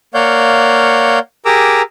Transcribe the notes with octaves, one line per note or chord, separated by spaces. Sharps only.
A#3 C#5 D5 F5 F#5 G6
G4 G#4 A#4 A#5 D6 E6